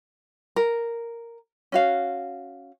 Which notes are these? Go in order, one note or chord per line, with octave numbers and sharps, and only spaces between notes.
A#4
C#4 F#4 F5